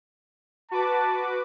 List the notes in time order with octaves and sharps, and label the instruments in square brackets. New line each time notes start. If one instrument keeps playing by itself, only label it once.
[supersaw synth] F#4 B4 D6 [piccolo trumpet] A5